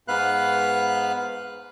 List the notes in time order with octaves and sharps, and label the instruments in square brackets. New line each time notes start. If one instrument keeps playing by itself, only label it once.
[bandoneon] G#2 B3 B4 F5 F#6